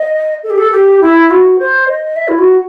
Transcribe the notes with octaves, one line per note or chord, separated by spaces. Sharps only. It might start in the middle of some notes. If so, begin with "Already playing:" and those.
Already playing: D#5
A4
G4
A4
G4
E4
F#4
C5
D#5
E5
E4
F#4